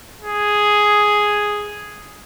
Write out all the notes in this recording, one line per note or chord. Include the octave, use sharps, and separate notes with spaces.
G#4